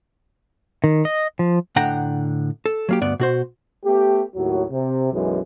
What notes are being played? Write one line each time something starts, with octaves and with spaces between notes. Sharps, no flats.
D#3
D#5
F3
A2 D3 F#5 G5 A#5
A4
F#3 A#3 G4
D2 G2 B3 D5
B2 F#4 C5
A3 B3 G4
D#2 A2 F#3
C3
B1 F#2 E3 F#3 G#3